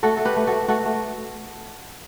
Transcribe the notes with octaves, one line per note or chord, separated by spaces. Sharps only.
A3 F#4 A4
A3 A4
G4 B4
A3
A3 F#4 A4
A3 F#4 A4
A3